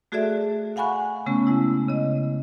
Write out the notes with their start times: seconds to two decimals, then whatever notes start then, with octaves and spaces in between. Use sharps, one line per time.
0.12 A3 F#4 G#4 A4 D5 E5
0.76 F5 F#5 G#5 B5 C#6 F#6
1.26 C#3 A3 B3 C#4
1.47 G#3 E4
1.88 C#3 D#5